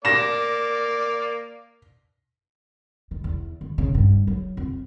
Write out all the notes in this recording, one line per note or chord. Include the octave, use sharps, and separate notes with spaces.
A#3 D5 A#6 E7
D#3
E2
D#3
C#3
G2
F#3
F2